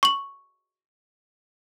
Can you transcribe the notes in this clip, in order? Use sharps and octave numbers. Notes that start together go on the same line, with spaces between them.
C#6 F#7